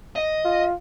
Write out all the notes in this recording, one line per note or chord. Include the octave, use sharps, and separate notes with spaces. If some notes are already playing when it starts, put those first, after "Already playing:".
D#5
F4